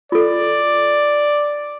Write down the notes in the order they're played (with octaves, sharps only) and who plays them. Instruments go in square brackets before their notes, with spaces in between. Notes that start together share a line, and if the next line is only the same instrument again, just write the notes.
[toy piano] F4 A4 [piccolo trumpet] D5